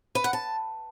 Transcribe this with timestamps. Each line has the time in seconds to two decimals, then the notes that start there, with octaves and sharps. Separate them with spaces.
0.15 B4
0.24 F#5
0.33 A5